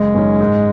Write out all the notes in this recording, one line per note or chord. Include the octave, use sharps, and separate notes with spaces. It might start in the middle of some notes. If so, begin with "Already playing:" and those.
Already playing: F#1 G#3
F#2 D#3 A#3 C#4
G#2